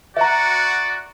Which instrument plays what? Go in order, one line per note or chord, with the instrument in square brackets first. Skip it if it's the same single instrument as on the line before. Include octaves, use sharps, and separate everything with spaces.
[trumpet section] F#4 [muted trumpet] D5 [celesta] E5 A#5